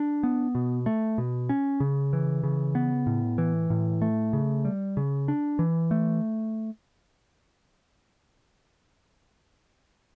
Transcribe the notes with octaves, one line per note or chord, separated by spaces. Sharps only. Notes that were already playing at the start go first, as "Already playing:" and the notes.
Already playing: D4
B3
B2
A3
B2
C#4
C#3
E3
C#3
B3
A2
E3
A2
A3
C#3
G3
C#3
D4
E3
A3